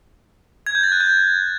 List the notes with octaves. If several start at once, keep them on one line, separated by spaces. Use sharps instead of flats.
G#6
G6
A6
F#6
G6